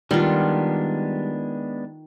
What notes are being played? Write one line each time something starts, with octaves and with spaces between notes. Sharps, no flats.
D#3 G3 G#3 B3 D4 F4